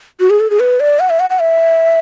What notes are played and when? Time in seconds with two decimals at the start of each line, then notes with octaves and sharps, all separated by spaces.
0.20 F#4
0.30 G#4
0.40 A4
0.50 G#4
0.60 B4
0.80 D5
1.00 F#5
1.10 E5
1.20 F#5
1.30 F#5
1.40 E5